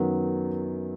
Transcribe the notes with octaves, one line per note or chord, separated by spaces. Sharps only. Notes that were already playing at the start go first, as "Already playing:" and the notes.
Already playing: F#2 D#3 F#3 B3